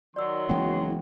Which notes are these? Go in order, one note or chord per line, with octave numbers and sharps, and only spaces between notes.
D#3 F#3 D5 C6 E6
F#1 E3 G#3 B3 F#5 G5